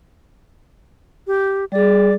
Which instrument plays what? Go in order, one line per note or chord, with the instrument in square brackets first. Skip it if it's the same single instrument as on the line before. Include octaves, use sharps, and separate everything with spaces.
[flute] G4
[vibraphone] G3 G#4 [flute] D5